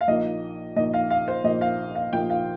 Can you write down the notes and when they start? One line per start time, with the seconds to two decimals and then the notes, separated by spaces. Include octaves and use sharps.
0.01 F5
0.08 A#1 A#2 A#3 D#4 D#5
0.76 A#1 A#2 A#3 D#4 D#5
0.94 F5
1.10 F5
1.28 C5
1.44 A#1 A#2 A#3 D#4 D#5
1.61 F5
1.95 F5
2.13 A#1 A#2 A#3 D#4 G5
2.30 F5